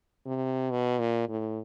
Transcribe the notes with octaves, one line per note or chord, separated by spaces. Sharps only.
C3
B2
A#2
A2